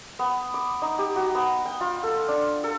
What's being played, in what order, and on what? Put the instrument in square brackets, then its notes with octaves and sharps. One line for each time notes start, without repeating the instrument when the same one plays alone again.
[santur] B3
D6
D#4
G4
F#4
B3
G5
F4
A4
D4
A4